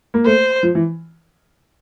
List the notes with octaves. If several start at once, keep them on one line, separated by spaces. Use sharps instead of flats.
A#3
A3 C5
F3
E3